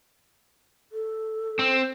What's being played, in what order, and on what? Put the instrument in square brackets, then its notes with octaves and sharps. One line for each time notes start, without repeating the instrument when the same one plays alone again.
[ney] A4
[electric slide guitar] C4